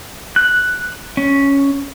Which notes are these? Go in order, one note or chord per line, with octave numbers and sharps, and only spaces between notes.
F#6
C#4